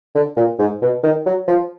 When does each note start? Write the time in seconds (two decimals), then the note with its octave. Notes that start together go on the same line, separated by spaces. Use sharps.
0.15 D3
0.36 A#2
0.59 G#2
0.81 B2
1.03 D#3
1.26 F#3
1.47 F3